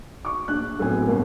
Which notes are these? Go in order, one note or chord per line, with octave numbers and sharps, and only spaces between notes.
C#6 D6
A#1 D4 F#6
A2 F#3 B3 C4 G#5
G1 C#3 A#3